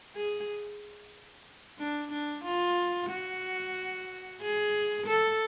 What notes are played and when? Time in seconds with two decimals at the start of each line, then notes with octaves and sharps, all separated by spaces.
0.16 G#4
1.80 D4
2.12 D4
2.45 F4
3.10 F#4
4.41 G#4
5.07 A4